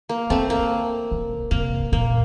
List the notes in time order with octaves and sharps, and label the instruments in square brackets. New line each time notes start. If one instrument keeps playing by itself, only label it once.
[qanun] A#3
[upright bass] D3 [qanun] A3 C4
[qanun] A#3
[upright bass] C3
[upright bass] C3 [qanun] A#3
[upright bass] A#2 [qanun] A#3